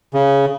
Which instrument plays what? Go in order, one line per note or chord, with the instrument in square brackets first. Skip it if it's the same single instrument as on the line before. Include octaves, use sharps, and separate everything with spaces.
[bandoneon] C#3